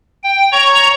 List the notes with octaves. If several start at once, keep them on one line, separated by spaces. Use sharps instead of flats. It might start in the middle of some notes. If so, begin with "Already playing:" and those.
G5
C#5 A#5 C#6